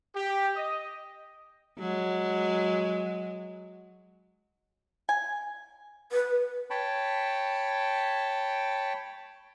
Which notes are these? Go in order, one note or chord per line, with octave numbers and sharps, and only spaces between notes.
G4
D#5
F#3 G#3
G#5
B4
C#5 G5 A5 B5